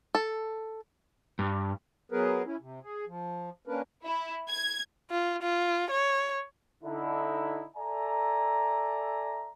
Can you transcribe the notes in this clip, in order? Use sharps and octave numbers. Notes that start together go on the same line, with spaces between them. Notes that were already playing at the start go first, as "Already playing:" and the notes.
A4
G2
F#3 B3 G#4 A#4 B4
C#4 E4
C3
G#4
F3
A#3 C#4 D4 A#4 B4
E4
G#6
F4
F4
C#5
D3 D#4 E4
A4 D5 E5 G#5 A#5